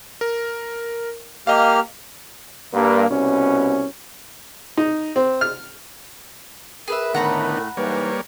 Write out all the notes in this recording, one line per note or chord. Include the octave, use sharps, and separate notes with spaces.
A#4
A#3 G4 D#5 F5 F6
G2 A#3
C2 B2 C#4
D#4
C4
F6
G#4 A#4 B4 E5
A2 D3 D#3 A3 B3 F#5 A#5 B5
G#2 E3 G3 A#3 B4 C#5